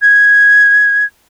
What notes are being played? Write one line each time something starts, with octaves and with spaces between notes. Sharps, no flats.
G#6